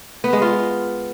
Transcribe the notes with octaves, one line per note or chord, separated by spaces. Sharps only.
B3
G#3
F4